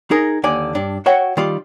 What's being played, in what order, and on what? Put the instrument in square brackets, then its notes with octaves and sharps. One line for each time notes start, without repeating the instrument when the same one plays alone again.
[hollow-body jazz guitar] D#4 G#4 A#4
D#2 D3 D5 G#5
G2 D4
F#4 C#5 E5 F#5 G5
D#3 G3 F4 D5